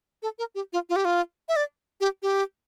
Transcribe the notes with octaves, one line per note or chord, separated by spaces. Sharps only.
A4
A#4
G4
F4
F4
G4
F4
E5
D5
G4
G4